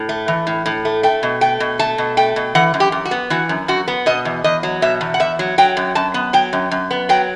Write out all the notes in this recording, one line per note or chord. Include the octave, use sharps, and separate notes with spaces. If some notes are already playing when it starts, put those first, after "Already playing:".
Already playing: A2
A3
E3
A2
A2
A3
A3 G5
B2
A3 G5
B2
A3 A5
B2
A3 G5
B2
E3 F#5
F#2
G4
F#2
F#4
B3
E3 F#4
F#2
F#2 F#4
B3
B2 D#5
E2
E2 D#5
F#3
B2 E5
E2
F#5
E2 E5
F#3
F#3 G5
F#2
F#2 A5
B3
F#3 G5
F#2
F#2
B3
F#3 G5